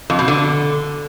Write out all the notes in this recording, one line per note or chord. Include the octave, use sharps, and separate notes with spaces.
F2
B2
D3